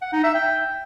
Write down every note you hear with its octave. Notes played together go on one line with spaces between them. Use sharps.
F#5
D#4
E5
G5